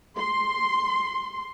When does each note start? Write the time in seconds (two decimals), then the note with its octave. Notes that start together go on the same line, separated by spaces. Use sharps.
0.18 C6